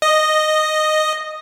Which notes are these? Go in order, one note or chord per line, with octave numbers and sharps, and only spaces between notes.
D#5